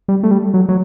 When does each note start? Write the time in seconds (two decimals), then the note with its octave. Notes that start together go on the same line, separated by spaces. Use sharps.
0.08 G3
0.23 A3
0.31 G3
0.54 F#3
0.69 F#3